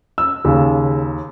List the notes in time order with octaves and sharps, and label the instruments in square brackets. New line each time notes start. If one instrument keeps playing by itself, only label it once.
[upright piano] E6
[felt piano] D#2 [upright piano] C#3